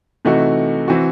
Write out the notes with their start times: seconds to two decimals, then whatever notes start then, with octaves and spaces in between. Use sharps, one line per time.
0.25 C3 E3 A3 D#4 F#4
0.88 E3 C4 F#4